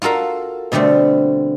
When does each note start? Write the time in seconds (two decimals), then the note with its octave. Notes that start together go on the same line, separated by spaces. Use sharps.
0.02 F4 F#4 A4 A#4 F5
0.72 B2 D3 G3 A3 C4